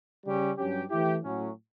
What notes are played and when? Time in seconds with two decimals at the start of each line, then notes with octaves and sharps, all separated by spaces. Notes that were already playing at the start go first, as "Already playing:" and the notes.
0.24 C#3 G3 C#4 G4
0.57 G2 F#3 C#4 G4
0.90 E3 A3 E4 G4
1.23 A2 F#3 C#4